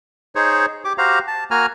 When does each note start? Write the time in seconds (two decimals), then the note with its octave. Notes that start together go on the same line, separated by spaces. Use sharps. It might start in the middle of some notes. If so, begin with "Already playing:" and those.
0.36 D#4 G#4 C5 C#5
0.85 G4 D6
0.98 F#4 G4 C5 F5 A#5
1.27 A5
1.51 A#3 F#4 G#5 A#5 F6